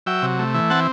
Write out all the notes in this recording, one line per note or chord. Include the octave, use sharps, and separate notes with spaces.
F#3 E5 G5
C3
A3
E3
C4 F#5 A5